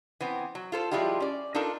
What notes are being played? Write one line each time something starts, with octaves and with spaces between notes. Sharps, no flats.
E3 B3 C4
F#3
F4 A4 C5
F3 G3 G#3 E4 F4 G4
C#4 D5
D4 D#4 F4 A4 A#4